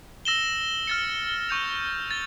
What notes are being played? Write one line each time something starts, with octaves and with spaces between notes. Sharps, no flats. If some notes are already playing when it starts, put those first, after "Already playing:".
E6 A#6 E7 G7
F6 A6 C#7
C#6 G6 C#7 F7
A6